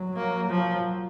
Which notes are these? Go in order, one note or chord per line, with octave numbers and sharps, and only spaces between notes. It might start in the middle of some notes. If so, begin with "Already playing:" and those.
Already playing: F#3
A#3
F3 F#3